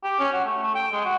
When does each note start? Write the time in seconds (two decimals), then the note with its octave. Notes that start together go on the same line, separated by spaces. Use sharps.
0.04 G4
0.20 C#4
0.32 F#4
0.44 A3
0.63 A3
0.75 G5
0.92 G#3
1.05 F#4